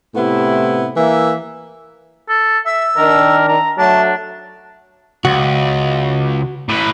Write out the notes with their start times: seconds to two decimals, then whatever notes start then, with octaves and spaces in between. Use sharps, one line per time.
0.15 A2 C3 B3 E4
0.96 E3 A#3 E5
2.29 A4
2.66 E5 E6
2.97 D#3 D4 A#4
3.48 A#5
3.78 F#3 A3 D4 A5
5.25 C#2 F#4
6.69 A2 B4